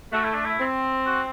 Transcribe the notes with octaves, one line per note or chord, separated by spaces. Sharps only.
A3 F#4
E4
D4
E4
C4
F#4